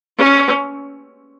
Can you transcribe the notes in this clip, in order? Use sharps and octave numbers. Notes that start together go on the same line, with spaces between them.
C#4